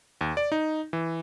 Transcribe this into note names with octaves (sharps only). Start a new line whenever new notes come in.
D#2
D5
D#4
E3